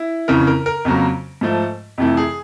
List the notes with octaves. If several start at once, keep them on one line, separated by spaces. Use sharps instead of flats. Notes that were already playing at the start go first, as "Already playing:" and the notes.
Already playing: E4
F2 C#3 E3 A#4
A#4
A#4
F2 C#3 F#3 A#3
G#2 F3 A3
F2 C3 E3 A3
G#4